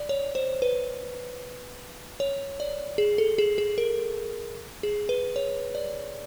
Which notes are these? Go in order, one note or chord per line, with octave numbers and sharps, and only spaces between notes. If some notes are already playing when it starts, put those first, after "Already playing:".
Already playing: D5
C#5
C5
B4
C#5
D5
G#4
A4
G#4
G#4
A#4
G#4
B4
C#5
D5